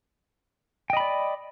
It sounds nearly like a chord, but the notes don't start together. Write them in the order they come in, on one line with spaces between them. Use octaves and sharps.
G5 D#5 B5 D5